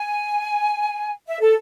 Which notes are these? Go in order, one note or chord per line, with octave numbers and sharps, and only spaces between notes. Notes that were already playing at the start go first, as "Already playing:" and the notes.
Already playing: G#5
E5
A4